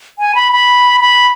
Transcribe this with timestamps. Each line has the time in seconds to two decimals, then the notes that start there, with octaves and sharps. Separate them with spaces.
0.19 G#5
0.35 B5
0.52 B5
1.01 B5